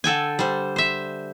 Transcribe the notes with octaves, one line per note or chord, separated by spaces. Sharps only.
D3 A4 G5 G#5
G3 C5
C5 E5